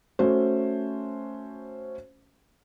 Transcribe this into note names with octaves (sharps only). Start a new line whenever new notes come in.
A3 C#4 F#4 C5